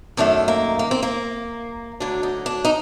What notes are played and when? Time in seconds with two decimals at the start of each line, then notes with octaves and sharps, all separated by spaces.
0.17 F#2 D#3 A3 D4
0.48 A#3
0.79 A#3
0.91 C4
1.03 A#3
2.00 D2 D3 F#3 D4
2.23 D#4
2.46 D4
2.65 D#4